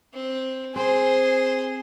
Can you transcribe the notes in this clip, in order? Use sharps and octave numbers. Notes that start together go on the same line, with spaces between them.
C4
C4 G#4 C5